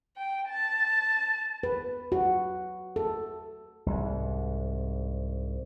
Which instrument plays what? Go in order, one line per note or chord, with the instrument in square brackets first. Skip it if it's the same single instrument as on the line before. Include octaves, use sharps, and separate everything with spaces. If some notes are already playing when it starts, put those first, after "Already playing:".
[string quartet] G5
A5
[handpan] B4
F#4
A4
[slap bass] C2 G#2